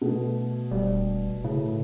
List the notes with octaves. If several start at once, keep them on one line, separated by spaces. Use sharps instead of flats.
B2 A3 F#4
E1 G3
A2 C#3